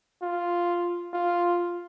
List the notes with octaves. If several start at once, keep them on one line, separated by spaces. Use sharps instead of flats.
F4
F4